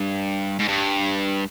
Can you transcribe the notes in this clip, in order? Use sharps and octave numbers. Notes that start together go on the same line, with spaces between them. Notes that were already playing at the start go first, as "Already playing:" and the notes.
Already playing: G2
G#2
G2